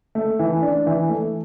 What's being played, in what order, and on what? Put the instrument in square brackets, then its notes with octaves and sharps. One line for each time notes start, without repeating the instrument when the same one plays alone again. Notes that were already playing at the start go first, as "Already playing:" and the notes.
[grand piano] A3
E3
D4
E3
A3